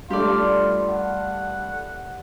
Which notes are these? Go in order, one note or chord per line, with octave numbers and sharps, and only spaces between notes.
G2 A3 F4 G4 D5
F#5